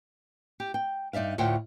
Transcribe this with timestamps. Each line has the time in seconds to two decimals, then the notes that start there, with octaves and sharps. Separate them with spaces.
0.60 G4
0.74 G5
1.13 G2 D#4 D5 E5 F5
1.38 D2 A2 F4 F#5 G5